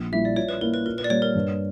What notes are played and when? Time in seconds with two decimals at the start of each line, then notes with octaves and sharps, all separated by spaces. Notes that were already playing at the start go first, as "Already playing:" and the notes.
Already playing: A#1
0.12 A#2 G3 A#3 E4 E5
0.25 D5
0.36 A#2 C#5
0.49 B4
0.61 A#3 E4 A#4
0.74 B4
0.86 A#2 A#4
0.98 B4
1.04 D5
1.10 G3 A#3 C#5
1.22 A#4
1.35 G2